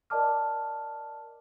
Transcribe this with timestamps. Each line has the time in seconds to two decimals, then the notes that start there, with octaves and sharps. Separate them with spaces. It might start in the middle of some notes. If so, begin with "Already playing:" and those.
0.10 A#4 D5 D#5 A5 D6 F6